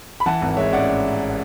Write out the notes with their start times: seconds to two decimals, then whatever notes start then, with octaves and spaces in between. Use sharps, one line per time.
0.20 B5
0.26 E3 F#5 A5
0.42 G#1
0.57 G#3 C#5 E5
0.72 A1 D5 F#5